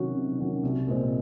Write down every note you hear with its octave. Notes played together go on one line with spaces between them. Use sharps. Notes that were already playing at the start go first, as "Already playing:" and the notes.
Already playing: C3 D#3 F#3 C#4 F#4
C3
D#3 F#3 C#4 F#4
C2
A#2 G#3 C4